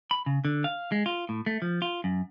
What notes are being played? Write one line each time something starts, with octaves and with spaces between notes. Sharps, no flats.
B5
C#3
D3
F5
G#3
F4
A2
A3
F3
F4
F#2